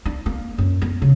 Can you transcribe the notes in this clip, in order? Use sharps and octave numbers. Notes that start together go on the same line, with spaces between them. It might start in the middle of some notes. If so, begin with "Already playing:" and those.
D4
A#3
F#2
B3
C#3